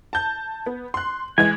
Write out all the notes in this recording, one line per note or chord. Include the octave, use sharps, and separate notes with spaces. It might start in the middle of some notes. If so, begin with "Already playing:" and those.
A5 G6
B3
C6 F#6
E3 G#3 G#5 G#6